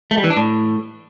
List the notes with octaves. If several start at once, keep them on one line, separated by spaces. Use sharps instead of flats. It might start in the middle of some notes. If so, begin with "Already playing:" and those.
A3
G3
E3
D4
A2